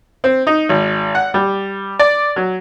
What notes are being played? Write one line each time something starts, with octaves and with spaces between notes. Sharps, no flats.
C4
D#4
G#1
F#5
G3
D5
F#3